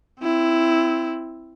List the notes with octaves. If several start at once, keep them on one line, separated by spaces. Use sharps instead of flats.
C4 E4